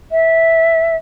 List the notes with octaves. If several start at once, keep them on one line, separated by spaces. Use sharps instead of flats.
E5